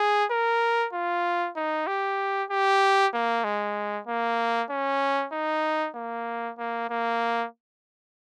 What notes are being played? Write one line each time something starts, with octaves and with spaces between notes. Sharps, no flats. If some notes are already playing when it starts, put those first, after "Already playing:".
Already playing: G#4
A#4
F4
D#4
G4
G4
A#3
G#3
A#3
C#4
D#4
A#3
A#3
A#3